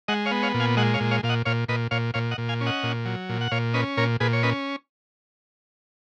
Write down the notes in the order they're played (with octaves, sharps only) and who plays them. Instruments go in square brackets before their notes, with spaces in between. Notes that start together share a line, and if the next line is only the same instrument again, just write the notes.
[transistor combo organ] G#3 D#5 F#5
C#5 F5
B3
C#5 F5
A#2
F5 G#5
G#3 D#5 F#5
C#5 F5
A#2
C#5 F5
A#2 F5
D#5 F#5
A#2 C#5 F5
A#2 B4 D#5
A#2 C#5 F5
A#2 C#5 F5
D#5 F#5
A#2
F5 G#5
C#4
D#5 F#5
A#2
F#3
A#2
F#5
A#2 C#5 F5
C#4 B4 D#5
A#2 A#4 C#5
A#2 G#4 B4
C#5
C#4 B4 D#5